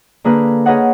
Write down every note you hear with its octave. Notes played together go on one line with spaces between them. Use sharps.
D3 A#3 G#4 A#4 B4
G#4 A#4 B4 C#5 D#5 F#5